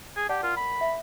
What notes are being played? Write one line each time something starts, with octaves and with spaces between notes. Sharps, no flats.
G#4
G4 D5 F#5 A5
F4 A#4
B5
E5